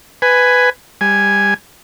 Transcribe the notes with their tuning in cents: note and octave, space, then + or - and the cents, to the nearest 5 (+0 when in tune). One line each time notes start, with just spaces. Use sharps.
B4 +10 G#5 +0
G3 +20 G#5 +0